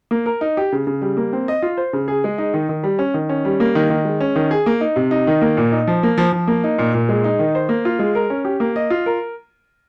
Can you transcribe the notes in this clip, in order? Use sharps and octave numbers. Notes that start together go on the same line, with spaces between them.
A#3
A#4
D#4
G4
C#3
C#3
G3
A#3
C4
D#5
F4
C5
C#3
G#4
G#3
D#4
D#3
D#3
G3
C#4
D#3
C#4
G3
A#3
D#3
D#3
G#3
C#4
D#3
G#4
A#3
D#4
C3
D#4
D#3
A#3
A#2
D#4
F3
A#3
F3
F3
A#3
D#4
A#2
A#2
G#3
D#4
D#3
C5
A#3
F4
G#3
A#4
C#4
G4
A#3
D#5
F4
A#4